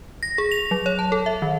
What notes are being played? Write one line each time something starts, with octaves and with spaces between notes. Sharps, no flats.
A#6
G#4
F7
F#3
C#5
A5
A4
E5
D#3